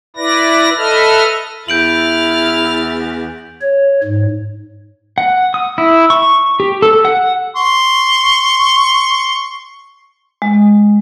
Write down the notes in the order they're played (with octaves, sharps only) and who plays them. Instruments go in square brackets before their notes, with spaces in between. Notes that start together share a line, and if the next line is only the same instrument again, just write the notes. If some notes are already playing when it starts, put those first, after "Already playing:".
[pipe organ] E4 B4 D5 A#6
A4 B4 D#5 E5 F6
[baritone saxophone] E2 [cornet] E4 [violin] F6 A6 [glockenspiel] G6 D7 F#7
[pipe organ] C#5
G#2
[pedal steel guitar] F#5
D#6
E4
C#6
G4
A4
F#5
[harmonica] C6 C#6
[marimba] G#3